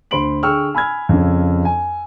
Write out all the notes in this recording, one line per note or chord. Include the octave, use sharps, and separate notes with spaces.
D2 C5 B5 C6 D7 F#7
D3 G#4 G5 C#6 E6 F6
G#5 B5 E6 F6 G#6
F2 C#3
G#5